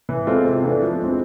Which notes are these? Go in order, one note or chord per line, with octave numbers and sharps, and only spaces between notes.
E3
G#3 C4 F4 A4
C3
E3 A3 D4
F3
G#3 C4